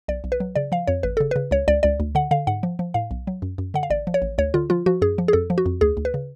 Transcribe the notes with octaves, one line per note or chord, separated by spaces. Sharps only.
B1 D5
B1
B4
F#3
C#3 D5
F3 F5
F2 C#5
G#1 B4
C#3 A4
C#3 B4
C#2 C#5
C#2 D5
C#2 D5
D2
D3 F#5
D3 F5
G#2 F#5
F3
F3
A2 F5
B1
F#3
F#2
F#2
D3 F#5
F5
A1 D5
F3
C#5
A1
D2 C#5
D3 F4
F3 F4
F3 F#4
F#2 G#4
F3
G#4
F2 A4
F3
F#4
F2
D2 G#4
D2
B4
C#3